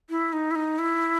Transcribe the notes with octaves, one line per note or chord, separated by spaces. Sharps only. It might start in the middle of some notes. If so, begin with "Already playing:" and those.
E4
D#4
E4
D#4
E4